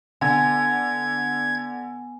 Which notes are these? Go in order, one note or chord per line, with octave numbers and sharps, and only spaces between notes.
D3 B3 G#5 G#6